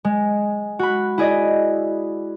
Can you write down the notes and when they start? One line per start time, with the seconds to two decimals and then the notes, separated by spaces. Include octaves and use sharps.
0.05 G#3
0.79 F#4 B5
1.18 E4 G#4 D5 D#5